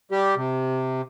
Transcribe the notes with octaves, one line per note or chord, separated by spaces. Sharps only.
G3 G4
C3